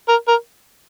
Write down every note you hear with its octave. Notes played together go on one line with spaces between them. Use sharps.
A#4
A#4